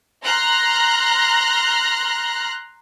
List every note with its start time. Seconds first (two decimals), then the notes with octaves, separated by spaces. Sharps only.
0.23 A#5 C6 F6 F#6 A#6